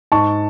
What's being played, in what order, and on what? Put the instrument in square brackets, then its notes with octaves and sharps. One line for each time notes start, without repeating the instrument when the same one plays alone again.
[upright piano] G#2 A5 C#6